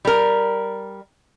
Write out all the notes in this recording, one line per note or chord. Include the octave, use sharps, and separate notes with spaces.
G3 A#4